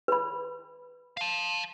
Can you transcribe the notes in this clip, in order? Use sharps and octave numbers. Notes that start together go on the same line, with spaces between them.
B4 B5
F5 A5